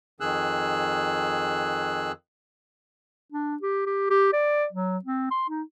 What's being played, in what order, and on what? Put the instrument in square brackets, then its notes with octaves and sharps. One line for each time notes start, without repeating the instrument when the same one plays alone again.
[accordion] F2 D#3 G#4 E6 F#6
[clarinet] D4
G4
G4
G4
D5
F#3
C4
C6
D#4